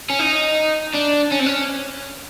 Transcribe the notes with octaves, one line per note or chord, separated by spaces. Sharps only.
C#4
D#4
D4
C#4
C4
C#4